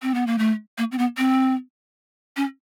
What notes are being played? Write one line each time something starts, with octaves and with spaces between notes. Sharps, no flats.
C4
B3
A#3
A3
A#3
C4
B3
C4
C#4